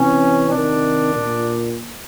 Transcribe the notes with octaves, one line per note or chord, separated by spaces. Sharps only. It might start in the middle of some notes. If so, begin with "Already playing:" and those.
Already playing: C3 E3 C#4
C3 D#3 D4
A#2